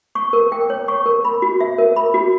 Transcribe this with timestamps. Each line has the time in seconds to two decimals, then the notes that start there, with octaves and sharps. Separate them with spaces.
0.15 C#6
0.33 A#4
0.52 G5
0.70 C#5
0.88 C#6
1.06 A#4
1.25 B5
1.42 F#4
1.60 E5
1.78 A#4
1.96 B5
2.14 F#4